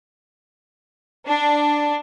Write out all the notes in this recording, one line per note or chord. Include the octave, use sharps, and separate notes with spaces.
D4